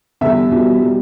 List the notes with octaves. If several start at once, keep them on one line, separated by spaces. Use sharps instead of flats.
E2 D3 G3 E5
E2 B2 G3
B2 G3